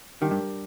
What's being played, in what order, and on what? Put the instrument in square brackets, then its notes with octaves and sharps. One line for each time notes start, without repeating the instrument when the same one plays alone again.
[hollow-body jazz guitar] D#3 [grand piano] G3 D4 G4 A#4
[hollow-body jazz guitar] G2